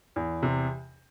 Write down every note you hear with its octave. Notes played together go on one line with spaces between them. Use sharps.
E2
C3